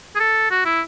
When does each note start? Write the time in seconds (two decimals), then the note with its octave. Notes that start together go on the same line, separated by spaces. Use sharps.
0.15 G#4
0.20 A4
0.51 F#4
0.65 E4